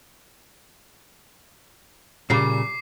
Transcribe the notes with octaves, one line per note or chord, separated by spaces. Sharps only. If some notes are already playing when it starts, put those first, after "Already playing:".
A#2 C#3 G3 D6 C7